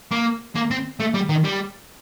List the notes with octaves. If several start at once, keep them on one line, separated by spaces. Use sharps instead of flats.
A#3
A#3
C4
A3
G3
D#3
G3